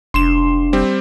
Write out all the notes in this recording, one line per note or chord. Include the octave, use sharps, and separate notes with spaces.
F1 D4 C6 E7
G3 C4